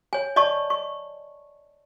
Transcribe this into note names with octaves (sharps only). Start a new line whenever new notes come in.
C#5 G#5
D5 D#5 A5 C#6
C#6